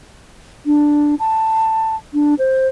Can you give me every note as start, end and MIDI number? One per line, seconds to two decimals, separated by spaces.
0.66 1.15 62
1.19 1.96 81
2.13 2.35 62
2.39 2.67 72